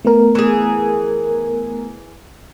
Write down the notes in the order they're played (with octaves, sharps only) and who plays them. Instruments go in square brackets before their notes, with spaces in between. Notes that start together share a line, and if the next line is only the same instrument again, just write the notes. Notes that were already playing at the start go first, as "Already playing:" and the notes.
[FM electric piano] A3 B3 A#4
[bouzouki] E3 G#4